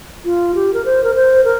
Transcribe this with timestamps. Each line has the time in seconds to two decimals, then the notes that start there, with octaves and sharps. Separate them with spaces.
0.25 F4
0.55 G4
0.74 A#4
0.85 C5
1.04 A#4
1.15 C5
1.44 A#4